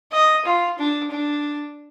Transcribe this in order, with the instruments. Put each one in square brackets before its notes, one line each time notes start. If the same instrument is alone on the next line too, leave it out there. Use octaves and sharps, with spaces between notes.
[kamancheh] D#5
F4
D4
D4